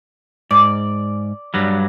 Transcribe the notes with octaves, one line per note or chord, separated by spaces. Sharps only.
G#2 D5
G2 F#3 G3